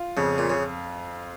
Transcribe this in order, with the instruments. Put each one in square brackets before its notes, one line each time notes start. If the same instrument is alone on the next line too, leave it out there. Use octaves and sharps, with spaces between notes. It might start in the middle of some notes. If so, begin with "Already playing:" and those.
Already playing: [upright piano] F4
[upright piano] F2 [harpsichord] C#3
[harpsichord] A#2
C#3